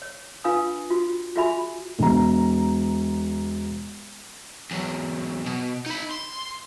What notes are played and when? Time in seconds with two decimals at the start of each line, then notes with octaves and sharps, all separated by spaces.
0.02 C#5
0.44 D4 F4 B4 F5 G#5 D#6
0.90 F4 F#4
1.36 F4 F#4 G#4 E5 G#5 B5
1.99 E1 A#5
4.71 E2 F#3
5.46 B2
5.86 D#4 B5
6.11 C6